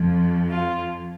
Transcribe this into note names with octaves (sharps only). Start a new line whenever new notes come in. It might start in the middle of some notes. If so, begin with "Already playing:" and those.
Already playing: F2 F3
F4